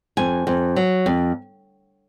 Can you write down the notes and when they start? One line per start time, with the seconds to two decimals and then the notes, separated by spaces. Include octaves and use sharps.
0.17 F2 G#5
0.47 F2
0.76 F#3
1.06 F2